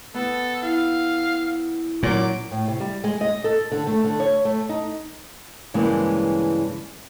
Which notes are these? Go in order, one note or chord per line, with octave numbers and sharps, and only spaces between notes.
B3 A4
E4 F5
A#2 F#3 C#4 C#5 D6
A2
C3
G3
G#3
D#5
A4
D3
A3
D3
C#5
A3
D#4
G2 C#3 E3 G#3 A#3